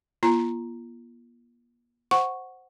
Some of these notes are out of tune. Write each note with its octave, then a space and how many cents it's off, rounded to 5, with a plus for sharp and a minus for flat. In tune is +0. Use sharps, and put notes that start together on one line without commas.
A#3 +45 F4 -30 A#5 +0
C5 +0 F#5 +0 C#6 +0